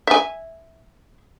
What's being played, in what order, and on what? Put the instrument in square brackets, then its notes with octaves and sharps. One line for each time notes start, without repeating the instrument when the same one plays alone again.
[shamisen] E5 G#5